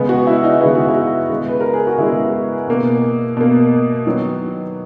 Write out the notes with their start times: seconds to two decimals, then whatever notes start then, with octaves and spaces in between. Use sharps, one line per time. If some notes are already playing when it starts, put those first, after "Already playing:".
Already playing: C#3 G#3 B3
0.09 F#4
0.27 E4
0.44 D#4
0.61 C#3 G#3 B3 E4
0.75 F#4
0.88 E4
1.29 C#3 G#3 B3
1.48 B4
1.61 A#4
1.73 G#4
1.87 F#4
1.98 C#3 G#3 B3 E4
2.68 B2 A#3
3.37 B2 A#3
4.06 D#3 F#3 B3